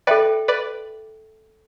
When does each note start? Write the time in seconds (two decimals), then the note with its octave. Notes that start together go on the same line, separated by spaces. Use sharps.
0.07 A4 B4 D5 E5 G5
0.48 B4 D5